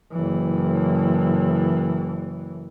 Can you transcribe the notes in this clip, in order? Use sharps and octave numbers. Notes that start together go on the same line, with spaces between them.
F#1 E3